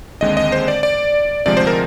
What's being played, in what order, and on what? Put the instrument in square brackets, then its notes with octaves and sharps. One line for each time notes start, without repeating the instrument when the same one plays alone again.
[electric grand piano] D#2 D3 G#3 C4 D#5
D#5
C5
D5
D5
D2 C3 F3 G#3 D5
C5
A#4